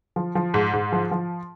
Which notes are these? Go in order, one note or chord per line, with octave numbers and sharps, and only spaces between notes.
F3
F3
G#2
G#2
F3
F3